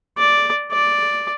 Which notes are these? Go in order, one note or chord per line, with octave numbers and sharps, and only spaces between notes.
D5
D5